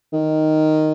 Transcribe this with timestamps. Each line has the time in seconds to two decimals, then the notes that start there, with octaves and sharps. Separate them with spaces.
0.13 D#3